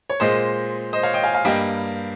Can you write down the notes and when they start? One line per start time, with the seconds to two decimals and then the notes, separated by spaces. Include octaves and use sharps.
0.09 C#5
0.20 A#2 G#3 C5 D#5
0.93 C5 D#5
1.03 C#5 F5
1.14 D#5 G5
1.24 F5 G#5
1.34 F5 G#5
1.45 G2 G3 A#3 D#5 G5